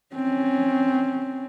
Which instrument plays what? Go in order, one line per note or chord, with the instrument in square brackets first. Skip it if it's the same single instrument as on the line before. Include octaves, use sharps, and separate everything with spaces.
[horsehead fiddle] C4 C#4